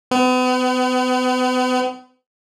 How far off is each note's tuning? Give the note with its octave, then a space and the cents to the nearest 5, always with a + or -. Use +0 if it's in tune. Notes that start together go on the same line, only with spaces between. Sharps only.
B3 +40